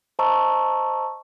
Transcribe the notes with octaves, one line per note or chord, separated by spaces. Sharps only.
C5 D#5 A5 A#5 C#6 E6